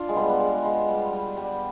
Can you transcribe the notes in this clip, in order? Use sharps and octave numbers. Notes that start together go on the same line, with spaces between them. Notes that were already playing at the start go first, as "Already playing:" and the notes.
Already playing: D4 F4
G#3
G3 B3
B3
G#3
G#3
G3
G3
G3